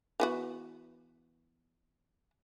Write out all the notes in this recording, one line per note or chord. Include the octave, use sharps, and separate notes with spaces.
E3 B3 F#4